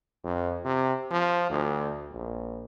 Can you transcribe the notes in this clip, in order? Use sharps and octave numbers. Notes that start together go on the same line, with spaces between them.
F2
C3
F3
D2
A#1